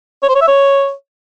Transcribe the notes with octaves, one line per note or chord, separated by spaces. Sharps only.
C#5
C5
C#5
E5
C#5